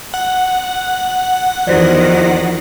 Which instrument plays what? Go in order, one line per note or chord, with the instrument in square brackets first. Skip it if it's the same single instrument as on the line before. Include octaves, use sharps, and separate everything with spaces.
[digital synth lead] F#5
[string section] E2 D#3 [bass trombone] F3 [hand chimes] F#4 C5 D5